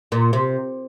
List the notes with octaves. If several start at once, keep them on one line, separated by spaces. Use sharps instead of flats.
A#2
C3